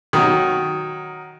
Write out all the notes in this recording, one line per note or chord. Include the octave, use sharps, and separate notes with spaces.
D#3 F#3